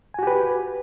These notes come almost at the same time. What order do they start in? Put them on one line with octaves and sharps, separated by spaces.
G#5 F#4 G4 B4